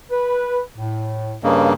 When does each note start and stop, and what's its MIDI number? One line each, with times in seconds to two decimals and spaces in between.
0.11 0.59 71
0.76 1.36 45
1.44 1.73 43
1.44 1.73 49
1.44 1.73 58
1.44 1.69 73
1.44 1.69 75